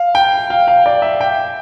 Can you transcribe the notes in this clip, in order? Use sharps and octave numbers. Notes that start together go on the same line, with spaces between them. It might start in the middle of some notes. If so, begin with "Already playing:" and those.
Already playing: F5
G5
F5
F5
D5
E5
G5